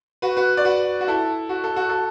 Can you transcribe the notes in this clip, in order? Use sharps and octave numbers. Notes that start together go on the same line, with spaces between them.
F#4 B4
F#4 B4
D5
F#4 B4
F#4
E4 A4
F#4
A4
F#4
A4